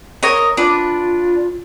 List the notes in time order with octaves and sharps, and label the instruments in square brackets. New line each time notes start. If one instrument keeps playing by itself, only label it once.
[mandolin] A#4 C#5 D#5
[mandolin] D4 B4 [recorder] F4